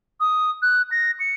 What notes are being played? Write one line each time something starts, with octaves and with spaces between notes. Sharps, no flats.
D#6
F#6
A#6
C#7